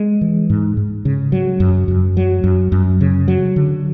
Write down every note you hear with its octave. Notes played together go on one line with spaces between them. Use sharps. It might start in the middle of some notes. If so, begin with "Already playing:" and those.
Already playing: G#3
E3
G#2
G#2
C#3
F#3
F#2
F#2
F#3
F#2
F#2
C#3
F#3
D3